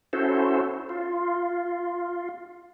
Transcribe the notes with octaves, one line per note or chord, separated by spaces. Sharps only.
C#4 E4 F#4 A4 C5
F4